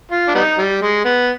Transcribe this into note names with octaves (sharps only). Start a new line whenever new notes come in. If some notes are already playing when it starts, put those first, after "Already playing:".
F4
D4
G3 B3 D#4
G3
G#3
B3